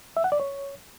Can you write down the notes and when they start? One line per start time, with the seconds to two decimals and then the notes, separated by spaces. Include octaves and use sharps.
0.17 E5
0.24 F#5
0.32 D5
0.40 C#5